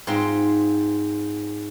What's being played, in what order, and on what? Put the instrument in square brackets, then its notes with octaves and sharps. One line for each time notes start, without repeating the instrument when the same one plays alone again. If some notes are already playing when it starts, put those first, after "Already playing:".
[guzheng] G#2 C4 F4 C6